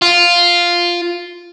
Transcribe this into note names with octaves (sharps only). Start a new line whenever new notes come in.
F4